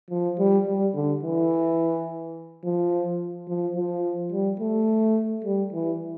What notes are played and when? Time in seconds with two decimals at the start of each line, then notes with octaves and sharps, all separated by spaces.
0.10 F3
0.39 G3
0.67 G3
0.95 D3
1.23 E3
2.64 F3
3.48 F3
3.76 F3
4.32 G3
4.60 A3
5.45 G3
5.73 E3